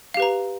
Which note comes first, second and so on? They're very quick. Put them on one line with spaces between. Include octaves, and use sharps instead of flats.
F5 G4 B4 A#5